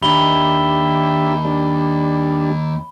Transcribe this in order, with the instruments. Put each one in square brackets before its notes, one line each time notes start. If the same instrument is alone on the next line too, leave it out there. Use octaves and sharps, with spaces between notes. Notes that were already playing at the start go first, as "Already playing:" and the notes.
[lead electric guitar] D#2 [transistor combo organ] D4 G4 E5 [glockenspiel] B5 G7
[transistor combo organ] G3 D4